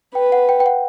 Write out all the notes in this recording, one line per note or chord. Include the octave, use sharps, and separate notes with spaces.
B4 G5
F#5
G5
G5
F#5